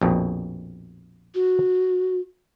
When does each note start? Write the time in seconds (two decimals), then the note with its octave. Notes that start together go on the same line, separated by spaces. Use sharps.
0.01 A#1 F2 B2
1.35 F#4